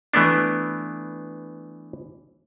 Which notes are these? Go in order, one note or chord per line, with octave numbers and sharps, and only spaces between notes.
E3 A3 B3 D4